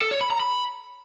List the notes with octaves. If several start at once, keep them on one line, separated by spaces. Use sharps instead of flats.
A4
C#5
B5
A#5
B5